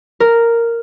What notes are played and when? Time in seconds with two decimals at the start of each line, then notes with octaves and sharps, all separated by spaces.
0.20 A#4